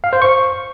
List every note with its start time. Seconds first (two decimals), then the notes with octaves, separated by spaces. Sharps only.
0.04 F5
0.13 C5
0.22 C#6